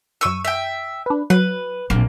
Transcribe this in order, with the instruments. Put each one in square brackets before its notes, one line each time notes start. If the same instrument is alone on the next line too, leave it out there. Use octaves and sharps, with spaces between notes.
[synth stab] F#2 D#7 [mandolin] C#6 E6
[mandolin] E5 G5
[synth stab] D4 B4
[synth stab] F#3 [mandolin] B4
[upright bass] A#1 C3 [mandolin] A#3